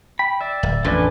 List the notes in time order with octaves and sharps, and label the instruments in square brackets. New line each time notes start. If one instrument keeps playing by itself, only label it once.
[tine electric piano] G5 [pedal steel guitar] B5
[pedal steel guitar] D5 E5
[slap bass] D1
[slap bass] A1 F2 A#2 [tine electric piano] D4 B4 D5 [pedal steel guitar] A4 G#5